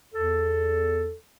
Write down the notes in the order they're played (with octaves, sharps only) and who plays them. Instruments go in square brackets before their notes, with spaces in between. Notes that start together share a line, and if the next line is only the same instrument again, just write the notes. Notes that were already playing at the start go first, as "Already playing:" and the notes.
[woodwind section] E2 A4